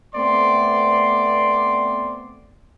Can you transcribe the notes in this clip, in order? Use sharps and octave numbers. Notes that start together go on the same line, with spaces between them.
A3 B3 C4 D5 C6